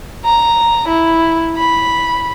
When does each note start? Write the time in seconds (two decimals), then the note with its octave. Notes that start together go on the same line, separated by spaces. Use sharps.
0.25 A#5
0.88 E4
1.56 B5